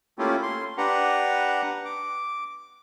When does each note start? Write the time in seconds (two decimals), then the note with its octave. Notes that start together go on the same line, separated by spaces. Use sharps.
0.19 A3 A#3 C#4 E4 F4 G4
0.43 C6
0.78 D4 G4 B4 F#5 A#5
1.85 D6